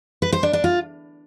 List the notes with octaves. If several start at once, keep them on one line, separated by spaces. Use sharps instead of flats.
B4
C5
D4
D4
F4